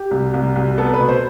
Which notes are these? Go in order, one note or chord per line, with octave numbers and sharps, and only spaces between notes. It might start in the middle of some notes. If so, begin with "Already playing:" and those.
Already playing: G4
C2
C2
C2
B3 A4
B4
B2
C5